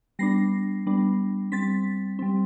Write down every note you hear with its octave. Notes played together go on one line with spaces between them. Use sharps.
G3 B3 D4 A#6 C7
G3 B3 D4
G3 C4 A6 B6
G3 C4